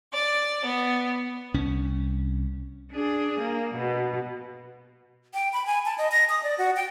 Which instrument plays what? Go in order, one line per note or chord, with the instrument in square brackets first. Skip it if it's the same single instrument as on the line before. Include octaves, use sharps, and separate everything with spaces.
[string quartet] D5
B3
[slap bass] C2 C#4
[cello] D4 G#4
A#3
B2
[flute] G5
B5
G#5
A5
D#5
A#6
D#6
D5
F#4
G5